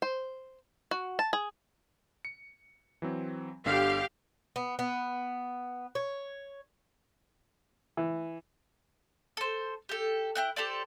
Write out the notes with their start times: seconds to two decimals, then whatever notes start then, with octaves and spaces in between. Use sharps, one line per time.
0.02 C5
0.91 F#4
1.19 A5
1.33 G#4
2.25 C#7
3.02 E3 F#3 C4
3.65 G1 D3 G4 F5 B6
4.56 B3
4.79 B3
5.95 C#5
7.97 E3
9.37 A4 C5
9.89 G4 A4
10.35 E4 G5 F#6
10.56 G4 A4 C5 D5